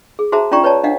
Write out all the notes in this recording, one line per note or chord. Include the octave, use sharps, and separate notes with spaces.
G#4
F#4 G#4 C5 E5 A5 A#5
C#4 F4 D5 G5 A#5 C#6
B4 C#5 D5 A5 A#5
D4 D#5 F5 F#5